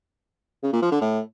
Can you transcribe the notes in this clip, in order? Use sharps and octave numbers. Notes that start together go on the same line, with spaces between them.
C#3
A#2
F3
D3
A2